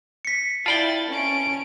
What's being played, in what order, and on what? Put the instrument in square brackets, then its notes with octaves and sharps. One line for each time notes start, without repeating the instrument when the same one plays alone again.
[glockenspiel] B6 C#7
[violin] E4 A6 [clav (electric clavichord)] F4 D5 G5 [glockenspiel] A5 B5 F#7
[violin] C#4 D7